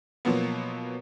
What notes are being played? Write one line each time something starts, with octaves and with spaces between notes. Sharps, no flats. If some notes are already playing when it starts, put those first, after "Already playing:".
B2 F3 F#3 A#3 B3